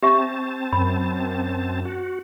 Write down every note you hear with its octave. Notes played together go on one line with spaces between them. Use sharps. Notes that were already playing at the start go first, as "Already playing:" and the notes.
C4 G4 E5 A5 C#6
F#2 B5
F#4